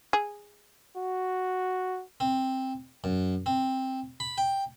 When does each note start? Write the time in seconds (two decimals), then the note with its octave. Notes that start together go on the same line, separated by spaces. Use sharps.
0.13 G#4
0.97 F#4
2.20 C4
3.04 F#2
3.46 C4
4.20 B5
4.38 G5